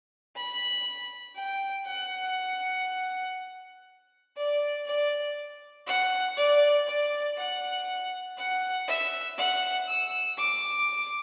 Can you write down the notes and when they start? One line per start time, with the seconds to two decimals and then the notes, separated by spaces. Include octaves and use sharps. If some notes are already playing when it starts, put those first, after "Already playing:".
0.36 B5
1.36 G5
1.86 F#5
4.37 D5
4.86 D5
5.87 F#5
6.37 D5
6.87 D5
7.38 F#5
8.38 F#5
8.88 E5
9.38 F#5
9.88 E6
10.38 D6